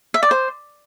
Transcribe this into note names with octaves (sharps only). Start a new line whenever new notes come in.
E5
D5
C5